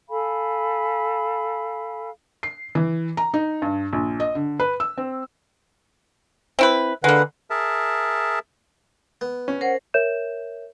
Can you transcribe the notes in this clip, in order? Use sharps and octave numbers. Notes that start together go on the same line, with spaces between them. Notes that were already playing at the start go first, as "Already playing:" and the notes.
A4 F5 G#5 B5
C7
E3
A#5
D#4
G2
A#1
D#5
D3
B4
E6
C4
C4 E4 B4
D3 G#3 A#3 B4 F#5
G#4 A#4 E5 A5
B3
C#4
A#4 C5 F#5
A#4 C#5 E5 G6 E7